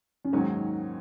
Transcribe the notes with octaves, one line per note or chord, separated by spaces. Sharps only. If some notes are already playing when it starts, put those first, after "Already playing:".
F#2
D#2 G#2 D#3 F#3 C#4